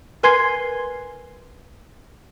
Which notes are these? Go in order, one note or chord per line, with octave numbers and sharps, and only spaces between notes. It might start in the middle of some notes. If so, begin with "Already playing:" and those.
A#4 B4 G#5 C6 G#6 C7